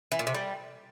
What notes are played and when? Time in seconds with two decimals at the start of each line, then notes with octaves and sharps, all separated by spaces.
0.12 E3
0.19 A#2
0.27 C3
0.34 G3